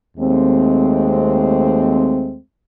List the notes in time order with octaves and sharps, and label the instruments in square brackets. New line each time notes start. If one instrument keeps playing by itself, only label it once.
[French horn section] D#2 G#3 A3 C4